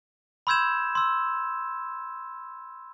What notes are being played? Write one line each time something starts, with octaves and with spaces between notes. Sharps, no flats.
B5 C6 E6 G6 G#6 E7
C6 E6